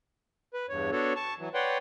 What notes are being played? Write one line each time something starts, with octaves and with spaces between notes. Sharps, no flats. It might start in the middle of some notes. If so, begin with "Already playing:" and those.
B4
E2 G2 C#5
B3 D4 F#4 A4 C#5
A5 C#6
E3 F#3
B4 C#5 D5 F#5 G5 C6